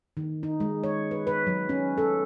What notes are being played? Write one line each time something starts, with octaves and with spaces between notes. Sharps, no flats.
D#3
D#4
G#3
C#5
B4
B4
F#3
C#4
A4